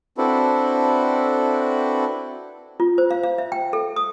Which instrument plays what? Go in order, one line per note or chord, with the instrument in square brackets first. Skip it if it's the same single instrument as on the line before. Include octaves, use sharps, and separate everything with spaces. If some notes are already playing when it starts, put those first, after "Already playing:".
[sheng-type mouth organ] C4 D4 E4 F#4 A4 B4
[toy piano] F4
C5
F5
F5
E5
G5
A4
D#6